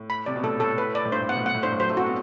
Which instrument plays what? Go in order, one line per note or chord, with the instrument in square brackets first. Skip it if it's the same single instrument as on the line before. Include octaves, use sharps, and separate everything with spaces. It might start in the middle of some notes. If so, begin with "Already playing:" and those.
Already playing: [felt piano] A2
[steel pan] B5
[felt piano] C3 [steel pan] D5
[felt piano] B2
[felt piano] A2 [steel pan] A4
[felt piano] A2 [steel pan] A4
[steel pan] B4
D5
[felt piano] A2
[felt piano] G2 [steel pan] C5
[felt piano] A2
[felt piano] B2 [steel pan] F#5
[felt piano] A2
[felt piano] B2 [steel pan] F#5
[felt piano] A2
[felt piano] G2 [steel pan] C5
[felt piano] A2
[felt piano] F#3 [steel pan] C5
[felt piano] A3
[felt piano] C4 [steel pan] F#4
[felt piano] B3